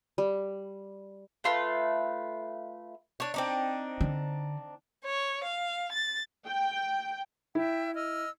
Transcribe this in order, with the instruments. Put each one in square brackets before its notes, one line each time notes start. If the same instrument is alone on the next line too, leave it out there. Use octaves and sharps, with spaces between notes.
[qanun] G3
[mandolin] A3 F4 B4
[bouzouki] D4 C#5
C4 D4 D#4
[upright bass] D3
[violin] C#5
F5
A6
[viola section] G5
[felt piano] E4 [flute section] E5 G5
[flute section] D#5 E6 F6